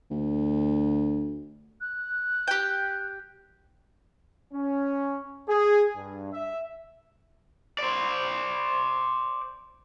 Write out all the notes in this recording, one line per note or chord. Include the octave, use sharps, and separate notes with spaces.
D2
F#6
G4 G5
C#4
G#4
G2
E5
C5 D5